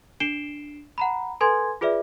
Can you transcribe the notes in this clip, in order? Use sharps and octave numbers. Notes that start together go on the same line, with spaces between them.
D4 C7 D7 E7 G7
F#5 A#5 B5
A4 B4 G#5 C6 G#6
F4 G#4 B4 D5 E5